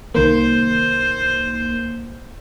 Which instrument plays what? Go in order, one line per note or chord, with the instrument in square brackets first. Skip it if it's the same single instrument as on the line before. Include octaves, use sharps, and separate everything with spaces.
[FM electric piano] C2 D#3 A#3 [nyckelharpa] C5